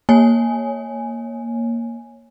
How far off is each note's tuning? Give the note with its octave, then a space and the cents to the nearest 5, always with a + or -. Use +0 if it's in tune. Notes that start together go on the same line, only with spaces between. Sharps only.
A#3 +0 C#5 +0 G#5 +0